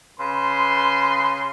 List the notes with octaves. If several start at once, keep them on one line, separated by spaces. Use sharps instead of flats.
C#3 B4 C6